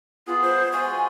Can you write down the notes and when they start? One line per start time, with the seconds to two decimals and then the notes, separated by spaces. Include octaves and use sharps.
0.27 B3 F4 G#4
0.42 C5
0.73 G#3 F4 F#4 G#5